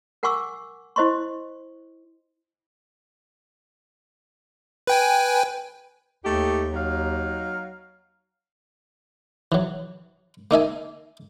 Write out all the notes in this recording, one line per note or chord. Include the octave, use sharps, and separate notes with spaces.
A#4 F#5 G#5 C#6 D6 E6
E4 C5 D#5 C6 C#6
B4 G5 G#5
D#2 A3 D#4 G4
F#3 D#4 F5
E3 F#3
A#3 D#4 E5 G#5